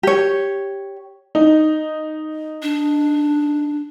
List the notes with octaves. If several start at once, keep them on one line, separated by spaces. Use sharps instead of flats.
G4 C#5
D#4
D4